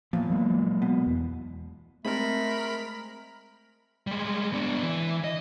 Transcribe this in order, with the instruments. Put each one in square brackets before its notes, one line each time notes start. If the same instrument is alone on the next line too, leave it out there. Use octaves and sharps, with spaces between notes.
[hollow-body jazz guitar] E2 A#2 [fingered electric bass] F3
[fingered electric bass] F#3 G#3 A#3
[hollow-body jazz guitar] B2
[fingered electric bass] E2
[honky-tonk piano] G#3 C4 [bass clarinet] A3 [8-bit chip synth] A#4 B5
[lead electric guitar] G3 G#3
B3 D4
E3
D#5